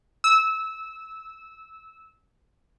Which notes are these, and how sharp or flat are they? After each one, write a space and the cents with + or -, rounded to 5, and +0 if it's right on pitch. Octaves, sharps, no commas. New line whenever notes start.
E6 -20